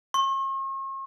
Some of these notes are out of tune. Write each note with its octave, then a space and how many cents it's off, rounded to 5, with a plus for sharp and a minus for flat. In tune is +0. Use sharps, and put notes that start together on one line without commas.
C#6 -45